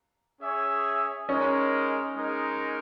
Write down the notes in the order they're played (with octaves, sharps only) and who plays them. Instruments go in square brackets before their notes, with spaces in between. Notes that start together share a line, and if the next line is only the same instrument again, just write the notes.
[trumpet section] C#4 G#4 C#5 E5
[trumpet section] G#3 D#4 A#4 [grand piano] C#4
[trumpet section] G#3 D#4 A#4